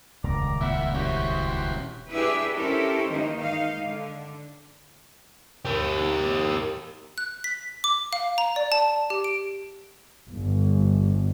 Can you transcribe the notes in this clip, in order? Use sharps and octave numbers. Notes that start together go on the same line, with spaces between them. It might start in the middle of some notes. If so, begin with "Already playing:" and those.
D#1 C#2 C#3 D5 A#5
A#2 E4 E5 F#5
C#4 E4 F#4 G4 C5
D4 E4 G4 G#4 B4 E5
C#4 E4 G4 A4 A#4 C5
D#3 E3 G#3 A#3 D#4
G#3 D#4 F5
D3
G4 A#4
F#6
B6
D6
F5
A#5
D5
A5
G4
D7
G1